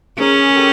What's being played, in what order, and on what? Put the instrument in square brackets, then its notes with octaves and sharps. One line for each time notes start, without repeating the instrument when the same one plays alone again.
[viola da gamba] C#4 [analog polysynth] G#4 A#4
[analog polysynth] G4 A4